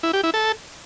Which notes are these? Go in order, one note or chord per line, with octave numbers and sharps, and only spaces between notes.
E4
G4
E4
A4